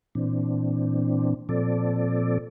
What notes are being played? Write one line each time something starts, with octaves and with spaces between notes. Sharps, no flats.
A#2 E3 C4 D4
A#2 F3 C4 A4 D5